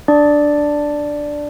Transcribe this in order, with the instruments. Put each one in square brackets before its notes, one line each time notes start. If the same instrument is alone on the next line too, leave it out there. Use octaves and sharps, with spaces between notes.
[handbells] D4 D5